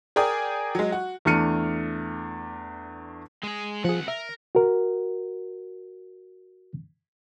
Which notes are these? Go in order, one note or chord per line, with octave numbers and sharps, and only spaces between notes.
G#4 A#4 D5 G5 G#5 D#6
F#3 G#3
F#4
E2 A3 D4 F6 C#7 D#7
G#3 G#4
C2 F3 G#4 F#5
A#4 E5
F#4 A#4